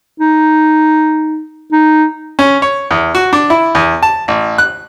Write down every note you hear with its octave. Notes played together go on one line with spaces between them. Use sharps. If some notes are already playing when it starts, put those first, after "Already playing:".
D#4
D#4
C#4
C#5
E2
F#4
D4
E4
E2
A5
A1
F#6